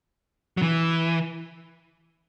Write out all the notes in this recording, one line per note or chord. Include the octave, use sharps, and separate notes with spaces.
F#3
E3